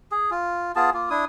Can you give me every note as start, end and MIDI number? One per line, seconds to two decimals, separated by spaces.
0.12 0.30 68
0.31 0.72 65
0.76 0.90 59
0.76 0.90 65
0.76 0.90 68
0.76 0.90 81
0.94 1.09 58
0.94 1.09 65
1.10 1.25 62
1.10 1.25 64
1.10 1.25 87